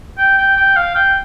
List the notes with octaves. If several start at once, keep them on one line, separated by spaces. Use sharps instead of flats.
G5
G5
G5
F5
G5